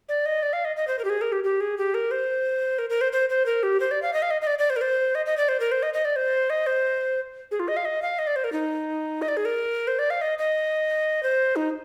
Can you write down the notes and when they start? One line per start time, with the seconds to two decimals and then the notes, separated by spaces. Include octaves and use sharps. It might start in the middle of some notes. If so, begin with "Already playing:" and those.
0.09 D5
0.26 D#5
0.43 D5
0.53 F5
0.65 D#5
0.76 D#5
0.88 C5
0.99 A#4
1.05 G4
1.10 G#4
1.21 A#4
1.32 G4
1.44 G4
1.61 G#4
1.78 G4
1.94 A#4
2.11 C5
2.79 A#4
2.90 A#4
3.01 C5
3.13 C5
3.30 C5
3.46 A#4
3.63 G4
3.80 C5
3.91 D5
4.02 F5
4.13 D#5
4.22 F5
4.31 D#5
4.42 D#5
4.47 D5
4.59 D5
4.70 C5
4.76 A#4
4.81 C5
5.15 D#5
5.26 D#5
5.37 D5
5.49 C5
5.60 A#4
5.72 C5
5.83 D#5
5.94 D#5
6.05 D5
6.16 C5
6.50 D#5
6.67 C5
7.51 G#4
7.60 F4
7.68 D#5
7.77 F5
7.85 D#5
8.02 F5
8.19 D#5
8.27 D5
8.36 C5
8.44 A#4
8.52 D#4
9.22 D#5
9.28 D5
9.37 G#4
9.45 A#4
9.87 C5
9.99 D5
10.10 F5
10.21 D#5
10.38 D#5
11.23 C5
11.56 D#4